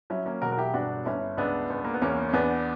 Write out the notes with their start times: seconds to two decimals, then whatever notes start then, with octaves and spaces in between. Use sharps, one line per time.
0.10 F#3 C#4 E4
0.26 A#3 C#4
0.42 E1 F#4 A#4
0.52 A#4
0.57 E4 G4
0.74 G1 D4 F#4
1.05 G1 C#4 E4
1.37 C#2 B3 D4
1.70 C#2
1.85 A#3
1.94 B3
2.02 E2 A#3 C#4
2.29 C#4
2.33 E2 B3 D4